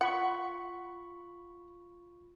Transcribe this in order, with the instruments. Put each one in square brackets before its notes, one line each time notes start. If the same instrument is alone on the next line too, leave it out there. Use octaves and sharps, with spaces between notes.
[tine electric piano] F4 B5 C#6 [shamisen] F#5